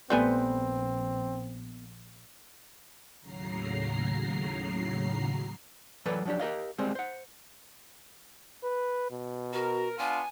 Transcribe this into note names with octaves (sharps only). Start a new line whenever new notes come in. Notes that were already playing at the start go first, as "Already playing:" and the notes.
A#1 G3 A3 B3 C4 B4 C5 G#5
D#2 A2 C#3 F#3 A#5 C7
E3 F#3 A4 B4 D5
F3 F#3 C4 D4 G4
G4 A#4 D#5 F5
G3 G#3 C4
C5 F#5
B4
B2
F#4 A#4
B3 D4 F4 G#5